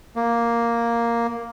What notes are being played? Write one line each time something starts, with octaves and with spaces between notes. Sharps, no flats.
A#3